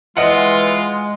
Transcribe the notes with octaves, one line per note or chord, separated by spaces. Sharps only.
E3 G#3 F4 D#5 F#5